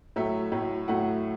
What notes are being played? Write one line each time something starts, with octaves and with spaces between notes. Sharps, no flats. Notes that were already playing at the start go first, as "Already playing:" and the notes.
A2 F#3 A3 E5
A2 F#3 A3
A2 F#3 A3 F#5